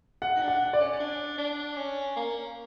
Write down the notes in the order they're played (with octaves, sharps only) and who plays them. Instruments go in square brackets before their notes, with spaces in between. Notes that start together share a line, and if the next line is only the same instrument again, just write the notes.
[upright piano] F#5
[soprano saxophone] D#4
D4
[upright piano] F#5
D5
[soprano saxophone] C#4
C#4
D4
D4
C#4
A#3